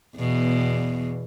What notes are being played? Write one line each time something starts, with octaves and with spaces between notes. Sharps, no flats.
E2 B2